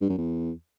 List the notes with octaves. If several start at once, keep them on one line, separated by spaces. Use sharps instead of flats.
G2
F#2
E2